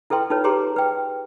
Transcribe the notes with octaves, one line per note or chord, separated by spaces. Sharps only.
E4 A4 B4 G5 C6
D#4 F4 A4 B4 C#5
G4 G#4 B4 A#5 C6 D6
B4 G5